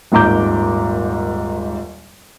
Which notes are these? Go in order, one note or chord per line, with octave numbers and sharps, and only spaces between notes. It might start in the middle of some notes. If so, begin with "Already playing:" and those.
D#1 G#1 G#2 A#5 D6 G6